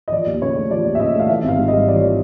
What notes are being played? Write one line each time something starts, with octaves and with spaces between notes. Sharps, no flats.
D#5
F3 D5
D#2
C#3 C#5
A3
F3 D5
D#2
E5
C#3 D#5
A3 F5
E3 E5
G#1 F5
G#2
G3 D#5
E3 D5
C#5
D5